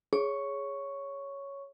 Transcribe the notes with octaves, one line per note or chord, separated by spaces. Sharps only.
G#4 C#5 C#6